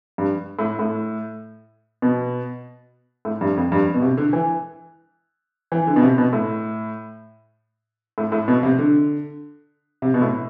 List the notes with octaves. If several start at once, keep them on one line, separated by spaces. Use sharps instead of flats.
G2
A2
A2
B2
A2
G2
F2
G2
B2
C3
D3
E3
E3
D3
B2
C3
B2
A2
A2
A2
B2
C3
D3
C3
B2
A2